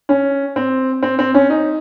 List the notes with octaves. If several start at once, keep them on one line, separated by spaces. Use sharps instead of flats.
C#4
C4
C4
C4
C#4
D#4